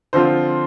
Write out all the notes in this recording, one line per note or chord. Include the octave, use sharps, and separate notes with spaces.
D3 F3 C4 F4 C5